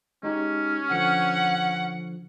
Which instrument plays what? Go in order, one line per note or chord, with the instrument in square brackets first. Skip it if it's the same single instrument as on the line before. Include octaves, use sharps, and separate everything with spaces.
[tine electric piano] G#3 D#4 G4 [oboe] C#4
[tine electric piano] D3 F3 C#7 [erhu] F#5